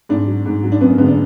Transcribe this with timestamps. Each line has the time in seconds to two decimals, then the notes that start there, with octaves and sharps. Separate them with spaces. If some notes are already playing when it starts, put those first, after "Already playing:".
0.09 G#2 D4
0.27 F#3
0.46 G#2
0.63 F#3
0.72 D4
0.81 F#2 B3
0.90 A#3
0.98 D3 B3
1.01 G#3
1.07 D4